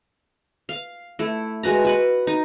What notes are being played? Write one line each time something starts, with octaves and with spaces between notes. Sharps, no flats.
F5
A3 E4
G#3 F#4 B4 A#5
F#4 B4 F#5
D#4